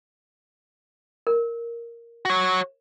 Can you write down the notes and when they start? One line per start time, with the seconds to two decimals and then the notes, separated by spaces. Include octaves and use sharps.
1.27 A#4
2.25 F#4 C#5